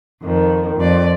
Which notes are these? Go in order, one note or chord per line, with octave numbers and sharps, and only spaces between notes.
F2 D#3
F2 D5